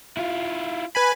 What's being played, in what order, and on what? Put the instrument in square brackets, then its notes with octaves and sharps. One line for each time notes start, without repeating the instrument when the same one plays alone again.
[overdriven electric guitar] E4 F4
[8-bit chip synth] B4 G#5 B5